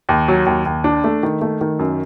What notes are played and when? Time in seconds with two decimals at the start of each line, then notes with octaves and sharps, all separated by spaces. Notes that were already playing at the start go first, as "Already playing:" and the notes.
0.09 D#2
0.28 F#3
0.46 D#2
0.66 D#2
0.84 D4
1.04 A3
1.23 D#3
1.42 A3
1.61 D#3
1.79 F#2